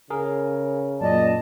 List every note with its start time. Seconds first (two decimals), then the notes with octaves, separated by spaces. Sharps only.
0.10 C#3 G#4 A#4
1.01 F#2 A#2 D5 D#5 A5